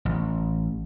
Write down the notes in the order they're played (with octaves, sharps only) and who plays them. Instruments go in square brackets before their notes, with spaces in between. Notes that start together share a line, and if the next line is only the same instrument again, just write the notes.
[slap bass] A1